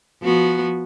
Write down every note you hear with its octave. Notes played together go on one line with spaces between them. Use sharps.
F3 B3 F#4